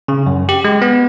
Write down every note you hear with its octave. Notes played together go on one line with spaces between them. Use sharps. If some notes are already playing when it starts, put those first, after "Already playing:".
C#3
F#2
G4
G#3
B3